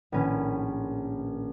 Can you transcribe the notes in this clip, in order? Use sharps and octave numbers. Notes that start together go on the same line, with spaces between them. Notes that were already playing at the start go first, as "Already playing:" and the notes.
A#1 A2 D#3 C#4 B4 D#7